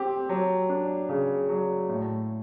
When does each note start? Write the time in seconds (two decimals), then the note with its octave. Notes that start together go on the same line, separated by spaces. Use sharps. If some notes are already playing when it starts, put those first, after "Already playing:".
Already playing: C4 G4
0.29 F#3
0.69 D4
1.09 C#3
1.49 F#3
1.89 A2